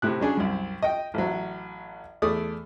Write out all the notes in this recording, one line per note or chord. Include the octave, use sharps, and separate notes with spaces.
A2 C3 F#6
F#3 C#4 D4 G#4
C2 F#2
D#5 G5
A1 F#3
E2 A3 D5 D#6